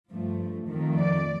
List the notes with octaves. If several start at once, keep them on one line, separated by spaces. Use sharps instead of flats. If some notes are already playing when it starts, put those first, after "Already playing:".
G2 F3 A3
F2 D#3 A3
D5